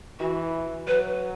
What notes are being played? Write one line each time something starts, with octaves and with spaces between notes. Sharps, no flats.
E3 F#4
F#3 B4